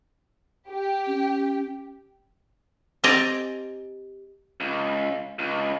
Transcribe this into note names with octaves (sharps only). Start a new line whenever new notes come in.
G4
C#4
C4 G4 D5 D#5 G#5 A#5
C#2
C#2